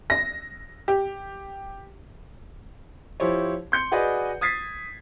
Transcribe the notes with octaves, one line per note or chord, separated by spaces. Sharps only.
A#6
G4
F3 E4 G4 C5 C#5
C6 G6 C#7
F#4 G#4 B4 D5 D#5
D#6 G#6 A6 B6 C7